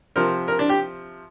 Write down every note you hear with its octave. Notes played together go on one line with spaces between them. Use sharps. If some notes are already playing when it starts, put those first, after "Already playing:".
C3 F3 A#4
A#4
D4
G4